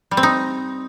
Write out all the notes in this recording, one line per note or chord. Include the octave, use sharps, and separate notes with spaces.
G3
C4
D#4